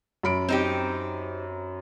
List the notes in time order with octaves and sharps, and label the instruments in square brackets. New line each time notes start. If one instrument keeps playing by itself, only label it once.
[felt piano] F#2 B5 D7
[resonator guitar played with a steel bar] C4 D#4 G4